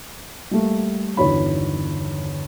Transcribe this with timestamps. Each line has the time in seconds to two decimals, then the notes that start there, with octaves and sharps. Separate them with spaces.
0.51 G3 A3 A#3
1.17 G1 E2 D#3 F#4 C#5 B5